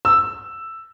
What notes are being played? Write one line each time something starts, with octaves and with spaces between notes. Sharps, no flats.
E6